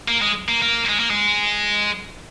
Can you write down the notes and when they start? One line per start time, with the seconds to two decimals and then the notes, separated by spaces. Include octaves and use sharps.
0.08 A#3
0.22 G#3
0.49 A#3
0.62 A#3
0.89 G#3
1.00 A#3
1.10 G#3